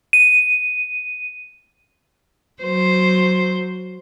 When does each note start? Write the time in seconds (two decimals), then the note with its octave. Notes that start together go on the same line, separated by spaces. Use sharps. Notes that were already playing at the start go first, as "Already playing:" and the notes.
0.13 D#7
2.62 F#3 C5